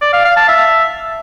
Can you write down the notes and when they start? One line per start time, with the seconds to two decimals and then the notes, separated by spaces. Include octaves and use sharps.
0.01 D5
0.13 F5
0.25 F5
0.36 A5
0.48 E5